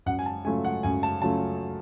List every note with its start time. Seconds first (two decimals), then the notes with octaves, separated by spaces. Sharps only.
0.06 F#2 F#5
0.19 G#5
0.26 A5
0.45 C#3 F#3 A3 F4 G#5
0.64 F#5
0.83 F#2 G#5
1.03 A5
1.22 C#3 F#3 A3 F4 A5